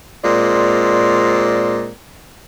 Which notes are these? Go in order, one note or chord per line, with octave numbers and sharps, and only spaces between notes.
A#2 G#3 C4 F4 D5